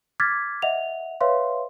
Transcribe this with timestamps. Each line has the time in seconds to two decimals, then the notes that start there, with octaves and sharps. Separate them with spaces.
0.20 D6 F6 G#6 A6 B6
0.62 D#5 E5 F#5 F7
1.21 B4 C#5 E5 F5 C6